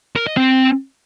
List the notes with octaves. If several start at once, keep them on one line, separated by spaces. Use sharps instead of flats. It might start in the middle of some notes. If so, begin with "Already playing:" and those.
A#4
D#5
C4